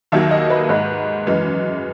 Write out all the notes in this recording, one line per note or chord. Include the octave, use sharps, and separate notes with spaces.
D#2 D#3 F#3 A#3 E5
D#5
B4
G#2 D#3 G#3 B4
F#2 E3 G#3